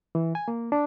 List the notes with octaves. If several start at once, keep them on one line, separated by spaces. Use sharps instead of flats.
E3
G#5
A#3
D4